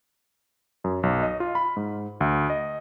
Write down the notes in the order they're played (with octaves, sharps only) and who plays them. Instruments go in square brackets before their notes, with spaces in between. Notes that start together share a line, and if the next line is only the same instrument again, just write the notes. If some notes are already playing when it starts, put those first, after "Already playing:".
[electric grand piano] F#2
B1
D#5
F4
B5
G#2
D2
D#5